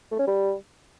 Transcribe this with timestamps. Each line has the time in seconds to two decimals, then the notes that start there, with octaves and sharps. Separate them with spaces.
0.11 A3
0.19 C#4
0.27 G3